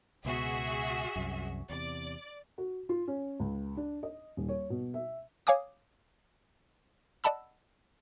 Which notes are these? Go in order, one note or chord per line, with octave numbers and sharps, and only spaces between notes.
C#2 B2 B3 F#4 G#4 E5
C2 F#2
E2 C3 D5
F#4
F4
C#4
C#2
D4
D#5
D#1
C#5
B2
E5
C#5 F5 G#5 D6 D#6
D5 D#5 F#5 A5 B5 E6